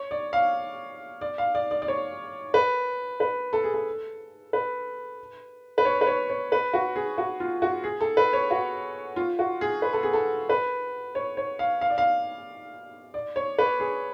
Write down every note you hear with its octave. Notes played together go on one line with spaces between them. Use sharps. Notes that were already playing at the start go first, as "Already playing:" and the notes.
Already playing: C#5
D5
F5
D5
F5
D5
D5
D5
C#5
B4
B4
A4
G#4
A4
B4
B4
C#5
B4
C#5
C#5
B4
F#4
G#4
F#4
F4
F#4
G#4
A4
B4
C#5
F#4
F4
F#4
G#4
B4
A4
G#4
A4
B4
C#5
C#5
F5
F5
D5
F5
D5
C#5
B4
G#4